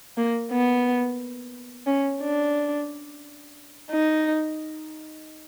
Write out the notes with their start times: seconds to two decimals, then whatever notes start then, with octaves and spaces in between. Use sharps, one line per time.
0.18 A#3
0.52 B3
1.87 C#4
2.22 D4
3.91 D#4